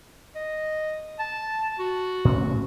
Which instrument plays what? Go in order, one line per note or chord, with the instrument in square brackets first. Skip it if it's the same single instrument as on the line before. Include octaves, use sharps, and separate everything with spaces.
[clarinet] D#5
A5
F#4
[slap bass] A2 C#4